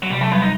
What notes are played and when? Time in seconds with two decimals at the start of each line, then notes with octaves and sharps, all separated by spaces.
0.03 F#3
0.10 C3 G3
0.21 F#3 A3
0.31 G3 B3
0.42 D#4